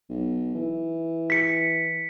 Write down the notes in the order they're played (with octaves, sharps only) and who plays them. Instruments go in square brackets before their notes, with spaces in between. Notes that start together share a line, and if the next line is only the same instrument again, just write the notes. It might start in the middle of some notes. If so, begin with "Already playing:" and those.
[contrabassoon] B1
E3
[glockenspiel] B6 C#7